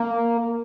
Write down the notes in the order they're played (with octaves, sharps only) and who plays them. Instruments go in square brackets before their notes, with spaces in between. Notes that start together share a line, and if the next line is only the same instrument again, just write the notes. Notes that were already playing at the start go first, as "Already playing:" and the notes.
Already playing: [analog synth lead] A#3